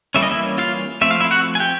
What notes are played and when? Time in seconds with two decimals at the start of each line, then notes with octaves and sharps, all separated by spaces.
0.15 E3 G3 A#3 C#4 E5
0.23 D#5
0.31 E4 E5
0.58 F4 F5
1.01 F3 A3 C4 E5
1.11 F5
1.20 E4 E5
1.31 F#4 F#5
1.55 G#5
1.60 G4 G5